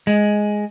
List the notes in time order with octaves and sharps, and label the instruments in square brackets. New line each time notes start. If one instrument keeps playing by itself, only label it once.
[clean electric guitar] G#3